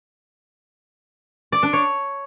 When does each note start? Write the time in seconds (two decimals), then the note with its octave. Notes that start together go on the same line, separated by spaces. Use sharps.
1.52 D5
1.63 D4
1.73 C#5